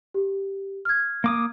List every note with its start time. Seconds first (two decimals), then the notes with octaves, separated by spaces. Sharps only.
0.14 G4
0.85 F6 G#6
1.24 A#3 D6 D#6